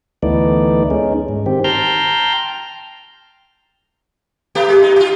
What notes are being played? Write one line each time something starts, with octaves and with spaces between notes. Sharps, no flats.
D2 E3 A3 B3 D#4 D5
G#3 C#4 D#4
G#2
D#3 C4 G4
G5 A5 A#5 C6 F6 G6
A3 B3 G4
G#3
D#4
F4 G4